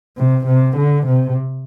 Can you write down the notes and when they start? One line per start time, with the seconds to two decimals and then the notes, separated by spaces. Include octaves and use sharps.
0.17 C3
0.47 C3
0.77 D3
1.07 C3